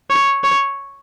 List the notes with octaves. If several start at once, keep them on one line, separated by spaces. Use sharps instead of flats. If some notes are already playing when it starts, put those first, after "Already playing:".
C#5
C#5